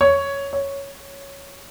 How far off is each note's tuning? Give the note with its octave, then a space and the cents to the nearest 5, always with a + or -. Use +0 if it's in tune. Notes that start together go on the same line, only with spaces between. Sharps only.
C#5 +5
C#5 +0